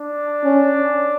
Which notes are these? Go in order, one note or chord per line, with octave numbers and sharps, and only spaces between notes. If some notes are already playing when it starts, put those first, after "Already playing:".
Already playing: D4
C#4